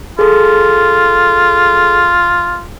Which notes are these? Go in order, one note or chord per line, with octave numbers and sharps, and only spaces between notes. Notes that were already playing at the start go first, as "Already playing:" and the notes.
F4 G#4 A4